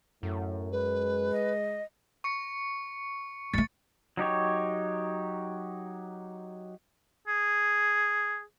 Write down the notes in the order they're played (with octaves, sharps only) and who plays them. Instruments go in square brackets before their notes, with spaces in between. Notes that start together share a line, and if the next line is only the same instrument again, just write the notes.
[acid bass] F#2 [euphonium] A2
[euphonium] G#3 [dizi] B4
[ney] D#5
[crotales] C#6 C#7
[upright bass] G3 A3 [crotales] A6 C#7
[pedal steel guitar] F#3 D#4 G4 C#5
[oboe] G#4